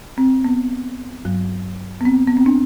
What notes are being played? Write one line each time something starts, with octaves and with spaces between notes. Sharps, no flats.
C4
B3
G2 F#3
B3
C4
B3
C4
D4